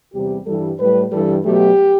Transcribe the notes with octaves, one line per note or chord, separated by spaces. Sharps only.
E2 C3 G3 G4
G2 E3 G3 A4
A2 G3 B4
G2 E3 G3 A4
B2 F#3 A3 G4